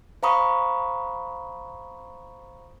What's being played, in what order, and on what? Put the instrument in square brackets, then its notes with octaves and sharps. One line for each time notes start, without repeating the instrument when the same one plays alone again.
[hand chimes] C5 F5 A#5 B5 C#6 D#6